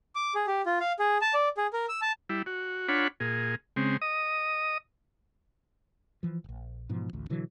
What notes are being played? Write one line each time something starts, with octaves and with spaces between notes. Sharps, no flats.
D6
G#4
G4
F4
F5
G#4
A5
D5
G#4
A#4
E6
A5
G3 E4
F#4
D4 F4 C#5 F#5 B5
A#2 G#4
C#3 G#3 C4
D#5 D#6
E3 F3
D#1 A#1
G#2 B2 E3 F3
A1 D2
B2 D3 E3 F#3